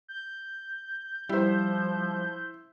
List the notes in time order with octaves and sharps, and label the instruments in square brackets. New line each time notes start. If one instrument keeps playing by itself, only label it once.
[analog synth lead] G6
[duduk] F3 [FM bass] G3 [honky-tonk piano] E4 C5